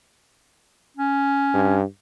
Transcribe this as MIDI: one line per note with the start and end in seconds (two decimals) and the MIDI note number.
0.97 1.78 61
1.54 1.83 43